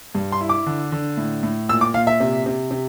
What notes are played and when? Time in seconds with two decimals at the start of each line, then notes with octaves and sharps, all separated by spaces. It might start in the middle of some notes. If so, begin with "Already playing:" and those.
0.15 G2
0.32 C6
0.41 E4
0.49 D6
0.66 D3
0.92 D3
1.17 A2
1.43 A2
1.69 A#2 E6
1.81 D6
1.94 A#2 F5
2.07 E5
2.20 C3
2.46 C3
2.71 C3